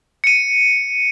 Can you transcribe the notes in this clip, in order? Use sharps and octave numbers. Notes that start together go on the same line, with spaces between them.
C#7 D#7